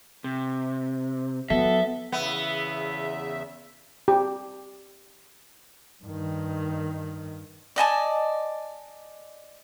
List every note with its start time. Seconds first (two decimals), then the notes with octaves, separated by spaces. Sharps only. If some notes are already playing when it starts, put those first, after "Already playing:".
0.24 C3
1.50 F#3 B3 A4 E5
2.12 E2 C#3 B3 E5
4.08 G4
6.04 G2 D#3
7.76 D5 D#5 G#5 A5